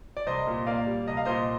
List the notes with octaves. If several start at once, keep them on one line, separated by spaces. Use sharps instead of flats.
D5
C2 C5 D#5
A#2
A#3 D5 F5
G3
C2 D#5
F5
A#2 C5 D#5